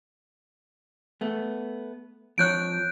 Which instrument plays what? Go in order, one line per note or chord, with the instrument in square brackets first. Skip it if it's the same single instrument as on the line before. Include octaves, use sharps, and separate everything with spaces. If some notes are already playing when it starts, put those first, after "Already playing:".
[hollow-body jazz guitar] A3 B3
[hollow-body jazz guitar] F2 F3 C#5 [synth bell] F#6 G6 D7